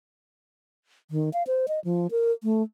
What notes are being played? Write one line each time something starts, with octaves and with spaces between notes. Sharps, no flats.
D#3
F5
C5
D#5
F3
A#4
A3